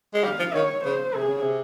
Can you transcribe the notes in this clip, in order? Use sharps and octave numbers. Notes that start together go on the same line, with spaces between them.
G#3
G3 F5
F3
D#3 C#5
C#3 C5
C3 G#4
C#3
C3